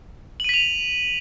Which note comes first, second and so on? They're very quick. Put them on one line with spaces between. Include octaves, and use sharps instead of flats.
F#7 D#7 B6 F7